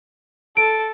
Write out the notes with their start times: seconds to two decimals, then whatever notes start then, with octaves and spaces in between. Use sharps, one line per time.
0.57 A4 D7